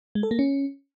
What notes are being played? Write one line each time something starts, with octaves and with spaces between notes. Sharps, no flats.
G#3
A4
A#3
C#4